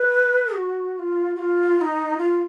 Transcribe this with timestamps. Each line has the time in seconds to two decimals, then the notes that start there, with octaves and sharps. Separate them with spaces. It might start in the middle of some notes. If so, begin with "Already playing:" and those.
Already playing: B4
0.54 F#4
0.94 F#4
0.99 F4
1.36 F#4
1.39 F4
1.77 F4
1.81 D#4
2.18 F4